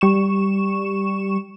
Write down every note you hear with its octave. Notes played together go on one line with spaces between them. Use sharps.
G3 C#6 E7